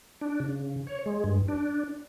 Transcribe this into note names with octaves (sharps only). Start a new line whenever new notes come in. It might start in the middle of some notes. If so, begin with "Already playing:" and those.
D4
C#3
C#5
G#3
G2
D4